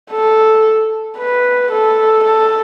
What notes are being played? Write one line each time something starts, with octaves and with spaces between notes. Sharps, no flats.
A4
B4
A4
A4